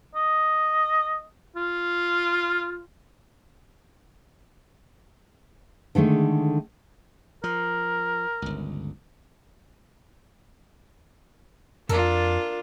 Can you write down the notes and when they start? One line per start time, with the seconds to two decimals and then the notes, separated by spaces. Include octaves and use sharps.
0.15 D#5
1.56 F4
5.95 D3 D#3 G#3 A3
7.44 F3 A#4
8.42 G1 C#2
11.89 F2 D4 F4 A4 A#4 A5